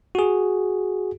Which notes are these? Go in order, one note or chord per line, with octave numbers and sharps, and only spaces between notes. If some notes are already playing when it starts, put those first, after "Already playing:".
F#4 G#4